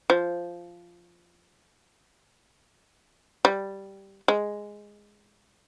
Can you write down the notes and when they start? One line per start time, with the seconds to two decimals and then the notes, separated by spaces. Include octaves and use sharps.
0.10 F3
3.45 G3
4.28 G#3